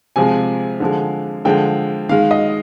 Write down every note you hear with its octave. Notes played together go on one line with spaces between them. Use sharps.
C3 F3 G#3 G#5
D3 F3 G#3
D3 F3 G#3 G5
D#3 G#3 F5
D#5